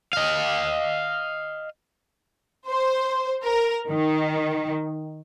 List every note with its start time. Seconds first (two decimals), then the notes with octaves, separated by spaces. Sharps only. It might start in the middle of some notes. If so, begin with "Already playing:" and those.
0.13 D#5 F5
2.67 C5
3.43 A#4
3.89 D#3